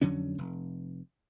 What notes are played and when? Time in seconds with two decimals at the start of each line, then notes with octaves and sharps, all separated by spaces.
0.01 F2 D3 F#3 C#4
0.38 F1